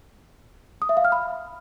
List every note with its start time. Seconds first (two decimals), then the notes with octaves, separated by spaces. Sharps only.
0.82 D#6
0.89 E5
0.97 F5
1.05 F6
1.12 B5